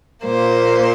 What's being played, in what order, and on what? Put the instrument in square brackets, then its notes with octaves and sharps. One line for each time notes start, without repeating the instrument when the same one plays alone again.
[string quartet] A#2 A#3 C5